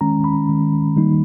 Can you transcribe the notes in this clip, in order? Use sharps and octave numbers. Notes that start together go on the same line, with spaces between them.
D#3 G#3 C#4 A#5
B5
D#3 G#3 C#4
D#3 G3 A#3 D#4